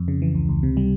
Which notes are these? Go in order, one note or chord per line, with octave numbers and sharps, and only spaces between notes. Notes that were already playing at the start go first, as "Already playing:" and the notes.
Already playing: F2
C#3
E3
C#2
C#2
C3
G3